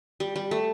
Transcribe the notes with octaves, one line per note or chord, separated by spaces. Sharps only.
G3
G3
A3